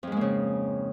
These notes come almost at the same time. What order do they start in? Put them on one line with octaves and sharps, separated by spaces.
F2 G#2 G#3 A#3 C#3